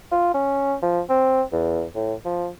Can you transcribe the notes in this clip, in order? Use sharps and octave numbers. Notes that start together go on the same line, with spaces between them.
F4
C#4
F3
C4
E2
A2
F3